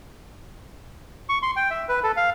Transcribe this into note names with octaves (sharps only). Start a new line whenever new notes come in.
C#6
C6
G5
E5
B4
A4
F5